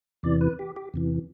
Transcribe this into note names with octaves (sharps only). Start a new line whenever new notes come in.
E2 C3 E3 D5
B4
G4
G4
E2 C3 E3